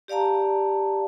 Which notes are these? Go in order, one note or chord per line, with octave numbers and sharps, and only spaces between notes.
G4 D5 F5 A5 A#5